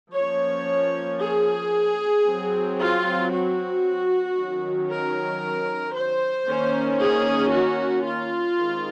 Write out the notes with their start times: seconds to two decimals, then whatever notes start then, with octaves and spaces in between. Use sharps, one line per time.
0.14 F3 A#3 C#4 C#5
1.20 G#4
2.25 F#3 C4
2.78 F4
3.31 F#4
4.37 D#3 F#3 C#4
4.89 A#4
5.95 C5
6.48 D#3 A#3 C#4
7.01 G#4
7.53 F#4
8.06 F4
8.58 D#3 G#3 C4